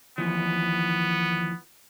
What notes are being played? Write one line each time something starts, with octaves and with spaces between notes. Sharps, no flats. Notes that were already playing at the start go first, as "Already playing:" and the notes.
D#2 E3 F3 B3